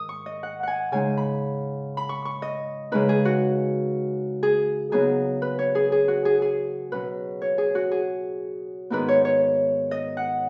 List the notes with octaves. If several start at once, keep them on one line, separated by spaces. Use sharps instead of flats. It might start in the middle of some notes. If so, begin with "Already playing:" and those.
Already playing: G#2 D#3 D#6
C#6
D#5
F#5
F#5 G#5
C#3 G#3 D#4 G#5
B5
B5
C#6
C#6
D#5
C#3 G#3 D#4 B4
G#4
F#4
G#4
C#3 F#3 B3 D#4 G#4
B4
C#5
G#4
G#4
F#4
G#4
G#4
B2 F#3 C#4 B4
C#5
G#4
F#4
G#4
G#2 D#3 B3 D#4 B4
C#5
C#5
D#5
F#5